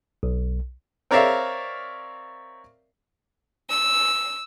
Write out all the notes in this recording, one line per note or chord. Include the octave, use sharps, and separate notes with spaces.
B1
C4 A#4 C#5 D5 E5 F5
E6